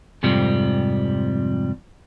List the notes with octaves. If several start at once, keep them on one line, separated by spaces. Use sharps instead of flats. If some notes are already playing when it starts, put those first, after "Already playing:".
F2 G#2 C3 F3 G3